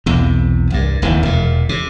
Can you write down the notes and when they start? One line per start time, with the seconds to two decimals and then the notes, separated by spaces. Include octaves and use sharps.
0.06 B1 E2 C3
0.70 C2 G2
1.02 D1 D#2 C3 E3
1.23 E1 A#2
1.69 C3